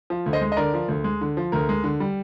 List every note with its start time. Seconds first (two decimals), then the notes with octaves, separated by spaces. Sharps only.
0.10 F3
0.26 D2
0.33 C5 D#5
0.42 G#3
0.52 D#5
0.57 D3 A#4 D5
0.74 F3
0.88 D2
1.04 G#3
1.21 D3
1.37 F3
1.52 D2 A#4
1.69 G#3
1.84 D3
2.00 G3